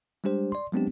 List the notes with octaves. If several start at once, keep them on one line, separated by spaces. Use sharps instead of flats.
G3 G#3 D4 G4 C5
D5 C6
F#3 G#3 B3 C4 D4 G4